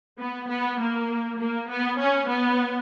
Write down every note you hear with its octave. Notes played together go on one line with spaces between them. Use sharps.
B3
B3
A#3
A#3
B3
C#4
B3